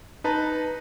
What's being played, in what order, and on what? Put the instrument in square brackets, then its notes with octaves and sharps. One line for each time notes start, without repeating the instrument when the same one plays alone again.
[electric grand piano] D#4 B4 A5 A#5